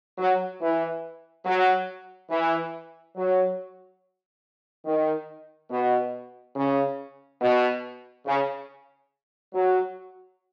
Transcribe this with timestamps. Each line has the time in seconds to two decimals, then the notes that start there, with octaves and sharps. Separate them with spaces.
0.18 F#3
0.61 E3
1.45 F#3
2.30 E3
3.16 F#3
4.86 D#3
5.71 B2
6.56 C#3
7.41 B2
8.26 C#3
9.54 F#3